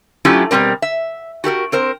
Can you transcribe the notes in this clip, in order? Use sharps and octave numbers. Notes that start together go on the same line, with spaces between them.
F#3 A3 C#4 E4 F4 G4
B2 D#3 G3 C4 A#4
E5
F#4 G4 A4 A#4
C4 A#4 C5